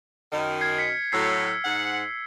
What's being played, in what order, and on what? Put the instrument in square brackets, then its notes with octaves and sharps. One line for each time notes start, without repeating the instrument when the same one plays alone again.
[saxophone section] F#2 D#3
[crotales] F6 G#6 C7
B6 C#7
[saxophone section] A2 F#3 [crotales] E6 G#6 C7
[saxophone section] G#2 F#5